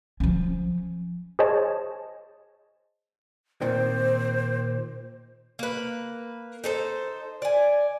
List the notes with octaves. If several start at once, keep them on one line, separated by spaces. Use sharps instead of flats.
F3 C#4
G#4 C5 C#5 D#5 A5
A#2 D#3 C4 C5
A#3 B4
D#4 A4 C5
D5 G#5